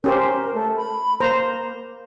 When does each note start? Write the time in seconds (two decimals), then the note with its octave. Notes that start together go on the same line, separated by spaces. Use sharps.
0.04 C#4 G4 A#4 C5
0.54 A3
0.76 B5
1.20 A#3 C5 A#5